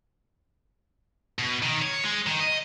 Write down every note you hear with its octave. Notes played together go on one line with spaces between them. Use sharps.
B2
D#3
C#5
G#3
D#3
D#5